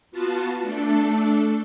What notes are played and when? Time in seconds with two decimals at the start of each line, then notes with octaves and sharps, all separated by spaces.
0.12 B3 F4 F#4 A5
0.62 A3 D4 A4